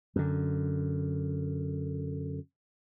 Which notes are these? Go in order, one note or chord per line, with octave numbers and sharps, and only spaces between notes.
F#2 D3